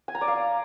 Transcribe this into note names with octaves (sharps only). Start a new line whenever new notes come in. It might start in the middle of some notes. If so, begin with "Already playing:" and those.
G#5
A#5
D5
F5